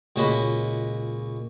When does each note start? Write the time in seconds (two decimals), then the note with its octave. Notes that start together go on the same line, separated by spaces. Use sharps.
0.16 C#2 A#2 C#4 F#4 D#5 B5